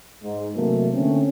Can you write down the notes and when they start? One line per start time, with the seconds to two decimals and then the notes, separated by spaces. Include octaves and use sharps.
0.23 G#2
0.56 C3 E3 F#3 A3 A#3
0.94 D3 A3 C4 C#4